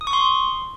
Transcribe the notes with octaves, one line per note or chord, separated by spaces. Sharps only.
D#6
C#6
C6